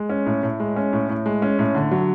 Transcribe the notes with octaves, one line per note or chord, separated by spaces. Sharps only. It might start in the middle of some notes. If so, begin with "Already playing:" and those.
Already playing: G#3
C#4
A2
A2
G#3
C#4
A2
A2
G#3
C#4
A2
D3
F#3